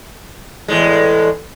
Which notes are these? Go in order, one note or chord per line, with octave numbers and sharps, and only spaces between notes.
E2 A2 G#3